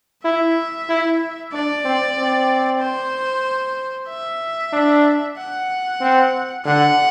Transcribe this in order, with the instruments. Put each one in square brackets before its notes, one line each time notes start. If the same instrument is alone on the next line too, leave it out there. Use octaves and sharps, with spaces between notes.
[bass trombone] E4 [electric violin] E5
[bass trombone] E4
[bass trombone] D4 [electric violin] D5
[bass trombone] C4
C4
[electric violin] C5
E5
[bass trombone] D4
[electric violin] F#5
[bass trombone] C4
[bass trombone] D3 [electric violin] F#5